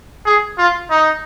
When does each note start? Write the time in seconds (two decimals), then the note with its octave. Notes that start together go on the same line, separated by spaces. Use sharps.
0.26 G#4
0.58 F4
0.90 D#4